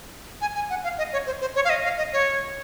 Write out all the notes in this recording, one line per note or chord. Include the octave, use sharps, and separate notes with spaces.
G#5
G#5
F#5
F5
D#5
C#5
C5
C5
C#5
F5
D#5
F5
D#5
C#5